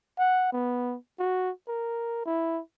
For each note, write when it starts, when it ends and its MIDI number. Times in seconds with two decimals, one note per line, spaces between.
0.19 0.49 78
0.52 0.96 59
1.19 1.51 66
1.68 2.22 70
2.25 2.60 64